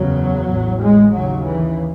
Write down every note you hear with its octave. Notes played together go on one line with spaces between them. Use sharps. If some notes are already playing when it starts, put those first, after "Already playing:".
Already playing: F#1 E2 C#3 F#3
A1 A2
G#3
D#2 C#3 F#3
E3